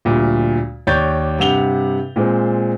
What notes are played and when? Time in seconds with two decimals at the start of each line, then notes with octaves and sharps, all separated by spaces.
0.05 D2 A#2 G3
0.87 D#2 C#5 D5 G6 A6
1.39 G2 C3 F#5 F7 G7
2.16 A#2 G#3 C4